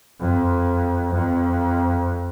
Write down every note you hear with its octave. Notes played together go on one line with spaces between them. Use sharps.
F2
F2